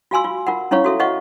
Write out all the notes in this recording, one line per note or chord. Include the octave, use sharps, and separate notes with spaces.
F4 F#4 F5 G#5 C6 E6
F4
F4 A#4 F#5
C#4 E4 C#5 F5 C#6
F#4 A4 E5
B4 D#5 F5 F#5 C#6